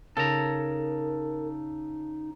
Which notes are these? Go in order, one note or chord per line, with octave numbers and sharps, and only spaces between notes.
C#3 D#4 A4 A#4 A#5